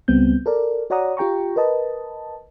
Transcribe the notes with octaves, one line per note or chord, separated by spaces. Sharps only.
C#2 G3 B3 C4 G6
A4 A#4 D5
F#4 C#5 D5 F#5 A#5 D#6
F4 G4 G5 A#5 C#6
A#4 B4 D#5 A5